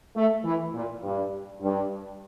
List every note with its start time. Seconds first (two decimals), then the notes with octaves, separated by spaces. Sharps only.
0.16 A3
0.44 E3
0.74 A#2
1.04 G2
1.62 G2